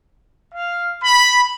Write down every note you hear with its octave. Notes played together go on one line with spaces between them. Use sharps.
F5
B5